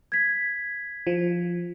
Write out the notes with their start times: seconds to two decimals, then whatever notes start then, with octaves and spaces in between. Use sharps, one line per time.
0.12 G#6 B6
1.07 F3